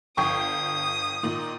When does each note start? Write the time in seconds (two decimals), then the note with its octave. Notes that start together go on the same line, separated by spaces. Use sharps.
0.17 G1 G5 C#6 D#6
1.23 A#2 D#3 D#4